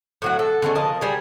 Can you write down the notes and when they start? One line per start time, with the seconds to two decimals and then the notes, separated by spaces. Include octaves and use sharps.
0.22 A2 F#3 F#4
0.39 A4
0.62 D3 G#3 A3 C#4
0.75 F3 A#4 D#5 A5
1.01 G3 G#4